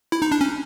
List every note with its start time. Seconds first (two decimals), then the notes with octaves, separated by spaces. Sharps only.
0.12 E4
0.22 D#4
0.32 D4
0.41 C#4